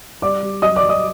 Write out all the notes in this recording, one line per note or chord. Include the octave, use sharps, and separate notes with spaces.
G3 D5 D6
G3
F#3 D#5 D#6
D5 D6
F#3
D#5 D#6